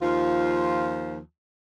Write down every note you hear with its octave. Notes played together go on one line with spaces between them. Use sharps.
D#2 F3 F4